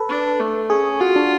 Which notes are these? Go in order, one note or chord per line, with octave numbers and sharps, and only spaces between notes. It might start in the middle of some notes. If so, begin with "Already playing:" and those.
Already playing: A4 B4
D4
A3
C#4 G#4
F4 F#4
D4